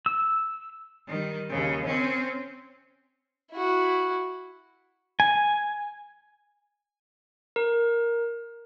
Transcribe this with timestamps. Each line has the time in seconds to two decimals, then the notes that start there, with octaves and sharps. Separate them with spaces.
0.06 E6
1.07 D#3 G3
1.49 D#2 C#3
1.86 C4 C#4
3.52 E4 F#4
5.20 G#5
7.56 A#4